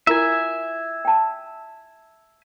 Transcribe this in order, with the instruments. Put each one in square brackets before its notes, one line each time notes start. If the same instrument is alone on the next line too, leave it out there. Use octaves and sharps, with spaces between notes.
[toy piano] E4 F4 A#4 [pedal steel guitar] E5 G#5
[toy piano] G5 A5